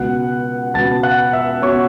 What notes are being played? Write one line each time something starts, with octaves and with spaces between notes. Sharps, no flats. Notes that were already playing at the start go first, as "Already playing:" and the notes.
Already playing: C#2 B2 B3 F#5 F#6
C#2 B2 B3 A5 A6
F#5 F#6
E5 E6
B2 B3 C#5 C#6